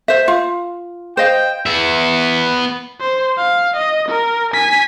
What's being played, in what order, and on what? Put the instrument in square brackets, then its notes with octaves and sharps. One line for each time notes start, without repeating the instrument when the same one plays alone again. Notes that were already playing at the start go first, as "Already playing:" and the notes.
[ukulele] C5 E5
F4
[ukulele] C5 D#5 F5 [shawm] G5
[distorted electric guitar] B3 E5
[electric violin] C5
F5
D#5
A#4
G#5 B6